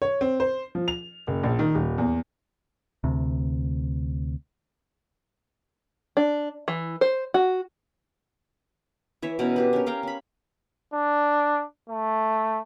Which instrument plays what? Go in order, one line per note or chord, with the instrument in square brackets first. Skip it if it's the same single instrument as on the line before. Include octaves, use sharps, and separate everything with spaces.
[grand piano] C#5
C4
C5
F3
F7
F#1
A#1
D#3
D#1
E2
[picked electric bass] D2 C3
[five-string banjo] D4
E3
C5
F#4
[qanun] E3 C#5 E5
B2 C#4 A#4 B4
D4 G4 B4
C#4 A#4
C#4 F5 G5 A#5
C#4 B5
[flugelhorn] D4
A3